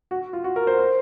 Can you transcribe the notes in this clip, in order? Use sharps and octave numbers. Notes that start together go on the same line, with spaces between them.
F#4
F4
F#4
A#4
C5
C5